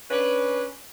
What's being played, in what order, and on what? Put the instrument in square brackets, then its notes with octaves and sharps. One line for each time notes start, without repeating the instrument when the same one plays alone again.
[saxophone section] C#4 D4 B4